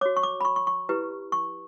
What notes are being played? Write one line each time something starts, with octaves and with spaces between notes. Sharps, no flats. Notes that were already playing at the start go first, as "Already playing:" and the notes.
F#4 C#5 D6
C#6
D6
B5
C#6
C#6
C#6
E4 G4 B4
C#6